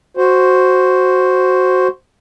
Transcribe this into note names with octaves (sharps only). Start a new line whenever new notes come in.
F#4 C5